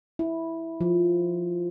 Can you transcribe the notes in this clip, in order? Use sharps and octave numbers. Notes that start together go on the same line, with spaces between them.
E4
F3